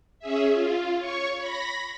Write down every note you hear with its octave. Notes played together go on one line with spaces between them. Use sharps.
C#4 G#4 E5
F4
C#5 C#6
B5 A#6